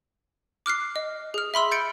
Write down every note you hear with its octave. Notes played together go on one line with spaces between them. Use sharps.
D6 F6 F#6 C7
D#5
G#4 F6
E5 B5 C6 E6
G6 A6 C#7 D7